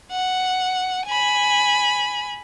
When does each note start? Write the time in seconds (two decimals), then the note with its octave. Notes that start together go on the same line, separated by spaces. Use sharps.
0.12 F#5
1.07 G#5 B5